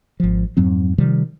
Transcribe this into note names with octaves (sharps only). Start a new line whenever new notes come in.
G#1 F3
F2 G#2 F#3 C4
C3 D#3 F3 G3